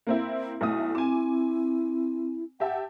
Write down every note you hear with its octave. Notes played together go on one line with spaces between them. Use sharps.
A#3 C4 E4
B1 A3 E4 D#6
C4 G#5 D6
G4 E5 F#5 A5